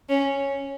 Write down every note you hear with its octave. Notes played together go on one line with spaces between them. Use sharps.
C#4